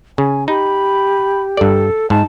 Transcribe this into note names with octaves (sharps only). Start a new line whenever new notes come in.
C#3 G#5
D#4 G4 B5
G2 A4 D5
G#2 D#4 A5